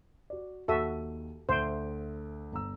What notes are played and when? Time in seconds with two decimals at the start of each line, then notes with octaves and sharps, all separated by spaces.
0.30 F#4 D5
0.68 D#2 F#4 A4 E5 D#7
1.49 D2 C5 E5 D7
2.52 G1 A#5 E6